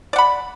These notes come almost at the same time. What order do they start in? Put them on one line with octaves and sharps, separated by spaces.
D5 F#5 B5